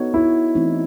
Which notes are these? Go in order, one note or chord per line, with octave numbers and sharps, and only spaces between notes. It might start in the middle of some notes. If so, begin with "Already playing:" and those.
Already playing: B3 D#4 F#4 A4 C#5
E4
E3 A3 C4 D#4